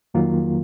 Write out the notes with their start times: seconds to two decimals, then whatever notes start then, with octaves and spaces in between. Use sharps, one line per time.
0.14 F2 D#3 F#3 A#3 F4